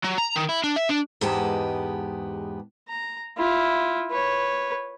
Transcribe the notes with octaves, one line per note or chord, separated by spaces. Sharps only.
F#3
A#5
D#3
E4
D4
E5
D4
E2 G#2 G#3 B3 G4 A5
A#5
E4 F4
B4 C#5